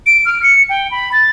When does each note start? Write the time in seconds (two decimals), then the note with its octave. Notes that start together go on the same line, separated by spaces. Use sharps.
0.06 D7
0.25 F6
0.43 C#7
0.69 G5
0.91 B5
1.12 A6